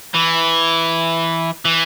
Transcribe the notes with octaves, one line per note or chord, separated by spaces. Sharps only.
E3
E3